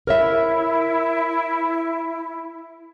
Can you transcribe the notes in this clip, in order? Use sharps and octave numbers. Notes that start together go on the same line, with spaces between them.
E4 A#4 C#5 E5